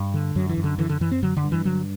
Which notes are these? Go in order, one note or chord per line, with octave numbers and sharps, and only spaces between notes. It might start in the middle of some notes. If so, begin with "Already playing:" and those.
Already playing: G2
D3
F#2 F#3
E3
F#2
D3
D3 E3
D3
F#2 E3
C4
D3 F#3
D3
G2
E3
D3 F#3